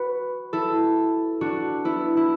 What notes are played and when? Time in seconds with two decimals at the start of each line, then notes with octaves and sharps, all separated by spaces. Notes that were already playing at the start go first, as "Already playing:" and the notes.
Already playing: F#4 B4
0.53 E4 A4
1.41 D4 F#4
1.85 B3 E4
2.17 E4